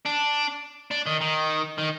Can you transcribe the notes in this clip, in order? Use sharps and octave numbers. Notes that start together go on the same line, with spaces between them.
D4
D4
D#3
D#3
D#3